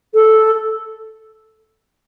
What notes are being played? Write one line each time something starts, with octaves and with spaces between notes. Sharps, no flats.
A4